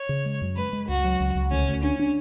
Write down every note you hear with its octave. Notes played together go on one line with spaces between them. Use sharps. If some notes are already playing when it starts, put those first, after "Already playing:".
Already playing: C#5
C#3
G#3
F#2
G#3 B4
G#3
C#2 F#4
F#3
C#2
C#2
D2 C#4
D2
C#4 D4
D4